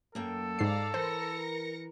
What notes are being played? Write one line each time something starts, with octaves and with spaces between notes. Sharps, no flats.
F#2 A#3 A4 G5
G#2 D5 F5 A#5 C7
E3 A#4 C5 A#6 C#7